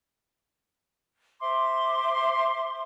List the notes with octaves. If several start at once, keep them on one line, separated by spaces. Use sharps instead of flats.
C5 E5 C6 D6